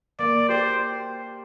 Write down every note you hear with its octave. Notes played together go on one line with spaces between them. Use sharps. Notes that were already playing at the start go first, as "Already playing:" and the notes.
A#3 D5
G4 C5